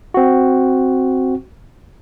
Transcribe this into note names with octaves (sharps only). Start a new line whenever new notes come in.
C4 F#4